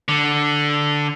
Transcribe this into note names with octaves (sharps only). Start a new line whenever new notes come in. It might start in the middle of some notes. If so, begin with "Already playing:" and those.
D3